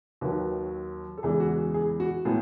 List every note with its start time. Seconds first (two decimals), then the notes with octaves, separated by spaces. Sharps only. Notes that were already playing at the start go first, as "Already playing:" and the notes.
0.21 D#2 D#3 F#3 B4
1.18 A4
1.23 E2 C#3 E3 G#3 G#4
1.40 F#4
1.58 G#4
1.74 G#4
2.00 F#4
2.25 A2 G#3 B3 G#4